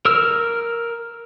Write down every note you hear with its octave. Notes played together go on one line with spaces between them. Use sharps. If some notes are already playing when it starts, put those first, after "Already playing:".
A#4 E6 F6